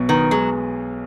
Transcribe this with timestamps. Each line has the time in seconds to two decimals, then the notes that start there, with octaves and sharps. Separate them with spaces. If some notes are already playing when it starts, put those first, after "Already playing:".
Already playing: B1 B2
0.09 D#3 B3
0.31 F#3 G#3